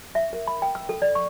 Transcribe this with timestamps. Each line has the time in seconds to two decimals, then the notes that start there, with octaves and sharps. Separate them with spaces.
0.15 E5
0.33 A#4
0.47 B5
0.62 G5
0.75 E6
0.89 A4
1.02 D5
1.15 C#6